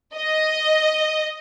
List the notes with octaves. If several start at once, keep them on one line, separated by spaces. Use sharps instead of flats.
D#5